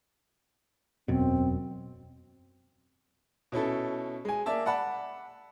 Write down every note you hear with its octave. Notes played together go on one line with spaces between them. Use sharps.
E1 F#2 B2 C4
B2 C#4 E4 A4
G#3 G#5
A#3 D5 E5 A5
D5 F#5 A5 B5